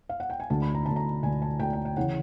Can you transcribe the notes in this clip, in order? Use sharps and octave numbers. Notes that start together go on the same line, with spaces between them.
F5
F#5
G5
G#5
D2 D3 A5
B5
A#5
D2 D3 A5
A#5
D2 D3 G#5
A5
D2 D3 G5
G5
G5
C#3 E3 F#5